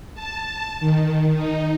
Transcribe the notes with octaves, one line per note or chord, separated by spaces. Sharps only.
A5
D#3
D#4